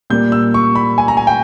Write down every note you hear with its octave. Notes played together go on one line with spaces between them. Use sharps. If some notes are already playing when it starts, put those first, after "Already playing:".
A#2 G3 A#3 G6
E6
C#6
B5
G#5
A#5
G#5
G5